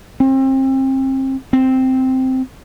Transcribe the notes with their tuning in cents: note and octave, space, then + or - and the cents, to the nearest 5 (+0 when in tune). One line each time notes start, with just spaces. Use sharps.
C4 +30
C4 -5